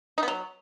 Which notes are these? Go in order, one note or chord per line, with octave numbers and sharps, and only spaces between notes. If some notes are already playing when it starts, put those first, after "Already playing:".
D#4
B3
F#3